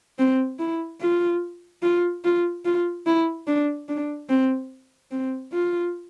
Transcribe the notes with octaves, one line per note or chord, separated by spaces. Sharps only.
C4
E4
F4
F4
F4
F4
E4
D4
D4
C4
C4
F4